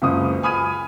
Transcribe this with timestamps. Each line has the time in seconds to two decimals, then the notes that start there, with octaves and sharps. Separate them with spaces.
0.02 F#1 C#2 D#6
0.43 G#5 B5 D#6 F6 G#6 D#7